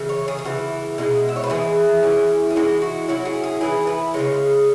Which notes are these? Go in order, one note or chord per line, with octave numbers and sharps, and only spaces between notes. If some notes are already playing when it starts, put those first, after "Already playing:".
Already playing: C#3 E3
C#5
G#4
G#4
C#3 E3 B3 E4 F#4
B2 G#3 E4
E5
C#5
B4
E3 B3 E4 G#4
E3 C#4 E4
G#4
E3 G#3 E4 F#4
F#4
F#3 C#4 E4 F#4
G#4
G#4
E3 B3 E4 G#4
B4
C#3 E3 G#3 C#5